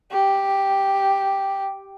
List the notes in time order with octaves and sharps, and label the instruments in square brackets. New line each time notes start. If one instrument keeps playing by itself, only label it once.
[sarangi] G4